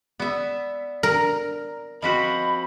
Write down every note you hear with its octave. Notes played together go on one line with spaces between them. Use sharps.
B3 D5 E5
A#4
F3 C4 F#4 D#5 B5 B6